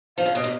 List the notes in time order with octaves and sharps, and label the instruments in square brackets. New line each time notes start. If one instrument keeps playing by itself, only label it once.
[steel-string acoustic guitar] F3 [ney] F5
[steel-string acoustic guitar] C#3
[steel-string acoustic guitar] B2 [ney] D#5
[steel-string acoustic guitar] A#2